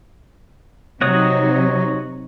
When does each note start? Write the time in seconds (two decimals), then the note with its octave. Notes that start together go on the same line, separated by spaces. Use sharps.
1.01 C3 F#3 D#4 F#4 C#5 D#6